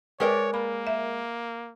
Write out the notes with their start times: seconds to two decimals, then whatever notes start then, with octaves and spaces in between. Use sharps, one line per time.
0.20 G#3 A#4 B4 C#5 D5 G5
0.54 A#3 B5
0.87 E5